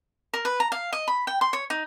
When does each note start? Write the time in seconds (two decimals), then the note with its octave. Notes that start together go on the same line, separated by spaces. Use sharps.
0.34 A#4
0.45 B4
0.60 A#5
0.72 F5
0.93 D#5
1.08 B5
1.27 G5
1.41 C6
1.53 C#5
1.70 D#4